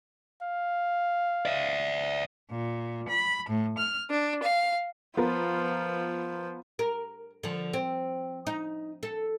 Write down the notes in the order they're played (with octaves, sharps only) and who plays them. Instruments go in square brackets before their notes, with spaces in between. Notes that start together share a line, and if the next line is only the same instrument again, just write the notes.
[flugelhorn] F5
[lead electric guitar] D5 E5
[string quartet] A#2
B5
A2
F6
D4
F5
[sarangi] F3 [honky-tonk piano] B3 F4 A#4
[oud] A#4
D3 F3
C4
D#4
A4